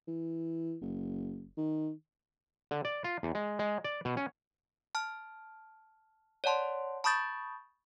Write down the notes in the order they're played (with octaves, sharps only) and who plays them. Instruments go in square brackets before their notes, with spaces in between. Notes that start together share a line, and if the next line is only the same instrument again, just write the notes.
[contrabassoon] E3
F#1
D#3
[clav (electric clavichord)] D3
D5
F4
E2
G#3
G#3
D5
B2
C#4
[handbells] A5 F6
C#5 D5 F#5 A5 C6
A5 B5 C#6 D#6 G6 A6